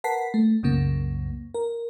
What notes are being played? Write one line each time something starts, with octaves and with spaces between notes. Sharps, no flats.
A#4 B4 F#5 A5 B6 C7
A3
C2 F#2 C#3 A#3
A#4